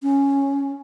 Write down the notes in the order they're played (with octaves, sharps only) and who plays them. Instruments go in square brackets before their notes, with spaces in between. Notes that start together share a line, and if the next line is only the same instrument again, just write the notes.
[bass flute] C#4